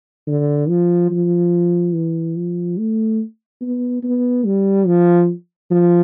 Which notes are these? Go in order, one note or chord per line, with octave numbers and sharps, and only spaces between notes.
D3
F3
F3
E3
F3
A3
B3
B3
G3
F3
F3